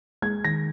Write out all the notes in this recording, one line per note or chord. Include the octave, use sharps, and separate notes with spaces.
G#3 G#6
D#3 A#6